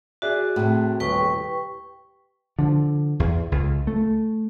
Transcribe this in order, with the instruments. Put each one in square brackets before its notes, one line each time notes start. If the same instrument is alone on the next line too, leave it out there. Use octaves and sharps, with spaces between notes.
[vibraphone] F#4 [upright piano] G#4 D5 E5
[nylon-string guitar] A2 C3
[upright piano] D#1 [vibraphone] B4 G5 C#6
[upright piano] G4
[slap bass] D3 F3
E2
C#2
A3